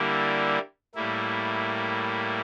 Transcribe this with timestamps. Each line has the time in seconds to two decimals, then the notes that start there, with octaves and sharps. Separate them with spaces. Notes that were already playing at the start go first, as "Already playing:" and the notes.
Already playing: D3 G3 A#3 E4
0.95 A2 G3 A#3 E4